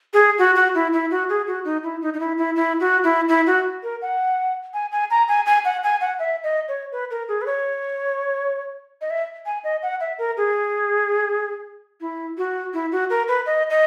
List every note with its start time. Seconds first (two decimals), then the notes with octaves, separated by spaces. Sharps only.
0.13 G#4
0.38 F#4
0.56 F#4
0.75 E4
0.93 E4
1.11 F#4
1.29 G#4
1.47 F#4
1.65 D#4
1.83 E4
2.02 D#4
2.14 D#4
2.20 E4
2.38 E4
2.56 E4
2.80 F#4
3.04 E4
3.28 E4
3.47 F#4
3.83 A#4
4.02 F#5
4.74 G#5
4.92 G#5
5.10 A#5
5.28 G#5
5.46 G#5
5.65 F#5
5.83 G#5
6.01 F#5
6.19 E5
6.44 D#5
6.68 C#5
6.92 B4
7.11 A#4
7.28 G#4
7.41 B4
7.46 C#5
9.01 D#5
9.10 E5
9.46 G#5
9.64 D#5
9.83 F#5
10.00 E5
10.18 A#4
10.37 G#4
12.01 E4
12.37 F#4
12.73 E4
12.92 F#4
13.10 A#4
13.28 B4
13.46 D#5
13.70 D#5